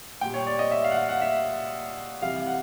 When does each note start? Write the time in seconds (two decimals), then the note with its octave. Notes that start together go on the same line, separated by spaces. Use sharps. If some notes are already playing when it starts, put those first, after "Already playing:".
0.21 A#2 G3 G5
0.34 C#5
0.47 D5
0.59 D#5
0.71 E5
0.84 F5
0.91 F#5
0.97 F5
1.09 F#5
1.21 E5
2.22 C3 E3 G3 F5
2.47 F#5